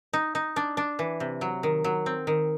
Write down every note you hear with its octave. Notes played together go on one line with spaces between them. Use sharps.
D#4
D#4
D4
D4
E3
C3
F#3
D#3
F#3
C4
D#3